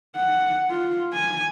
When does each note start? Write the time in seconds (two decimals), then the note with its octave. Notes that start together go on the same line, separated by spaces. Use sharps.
0.16 F#5
0.70 F4
1.14 G#5